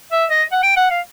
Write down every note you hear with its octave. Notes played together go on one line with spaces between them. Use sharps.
E5
D#5
F#5
G5
F#5
F5